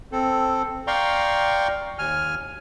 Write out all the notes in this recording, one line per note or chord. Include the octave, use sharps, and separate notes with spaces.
C4 A4
D5 F5 G5 A#5 C6 C#6
D#2 G#5 F6